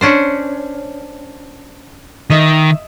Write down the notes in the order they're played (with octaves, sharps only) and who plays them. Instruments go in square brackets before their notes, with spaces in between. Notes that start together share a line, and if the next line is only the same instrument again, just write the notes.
[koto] C#4 D4 C5
[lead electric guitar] D#3 [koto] D#5 E5